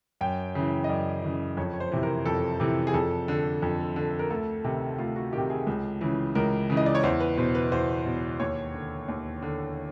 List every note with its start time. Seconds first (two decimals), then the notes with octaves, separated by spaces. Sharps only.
0.21 F#2 G5
0.55 C#3 E3
0.84 D#5
0.89 F#2 D5
1.23 C#3 E3
1.57 F2 C#5
1.73 C#5
1.80 C5
1.92 C3 E3
2.03 A#4
2.26 F2 A4
2.60 C3 E3
2.87 G#4
2.94 F2 A4
3.28 D3
3.62 F2
3.96 D3
4.19 A#4
4.30 D2 A4
4.64 C3 D#3
4.98 D2 F4
5.16 F#4
5.33 C3 D#3 G4
5.50 G#4
5.67 C#2
6.01 C#3 E3
6.35 C#2 A#4
6.70 C#3 E3
6.77 D#5
6.86 D5
6.95 C#5
7.03 E2 C5
7.20 B4
7.37 B2 C5
7.55 B4
7.72 E2 C5
8.06 B2
8.39 D#2 C#5
8.74 D3
9.08 D#2
9.42 D3